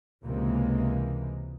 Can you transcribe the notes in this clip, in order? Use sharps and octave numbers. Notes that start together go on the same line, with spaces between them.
C#2 C3 E3 G#3 A#3